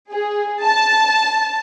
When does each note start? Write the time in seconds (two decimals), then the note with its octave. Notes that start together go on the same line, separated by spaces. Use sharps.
0.11 G#4
0.63 A5